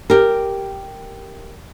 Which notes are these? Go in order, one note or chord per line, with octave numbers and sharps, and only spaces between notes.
G4 A#4